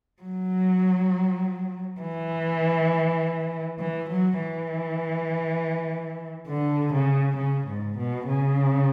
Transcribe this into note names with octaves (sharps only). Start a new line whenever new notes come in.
F#3
E3
E3
F#3
E3
D3
C#3
C#3
G#2
B2
C#3